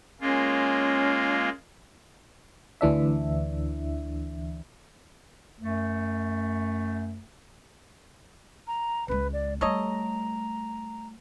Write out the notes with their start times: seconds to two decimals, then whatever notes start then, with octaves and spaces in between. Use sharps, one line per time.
0.21 G#3 A#3 C#4 F4
2.81 D2 E3 D4 E5
5.61 F#2 A3
8.67 A#5
9.08 C#2 G#3 B4
9.33 D5
9.61 G3 A3 A4 C#5 D#5 A#5